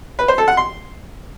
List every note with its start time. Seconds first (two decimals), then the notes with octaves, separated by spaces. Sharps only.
0.19 B4
0.28 C5
0.38 A4
0.48 F#5
0.57 C6